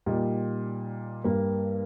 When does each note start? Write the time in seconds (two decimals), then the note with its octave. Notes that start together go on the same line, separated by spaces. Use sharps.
0.06 A#2 G3 D#4 G4 A#4
1.24 G2 G3 A#3